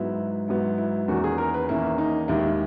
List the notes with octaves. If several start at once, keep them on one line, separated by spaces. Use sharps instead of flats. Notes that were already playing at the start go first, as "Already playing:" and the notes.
Already playing: G#2 F#3 B3 E4
G#2 F#3 B3 E4
E4
E2 D#3 A#3 C#4 F#4
G#4
A#4
B4
E2 D#3 A#3 C#4 E4
D#4
D#2 D#3 G#3 E4